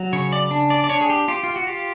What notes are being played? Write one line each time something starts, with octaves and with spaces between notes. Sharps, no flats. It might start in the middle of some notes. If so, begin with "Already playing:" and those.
Already playing: F#3
C#3 C#5
D5
D4
D5
D5
D4 C#5
G#4
G4
F4 G4
F4
F#4
F4 G4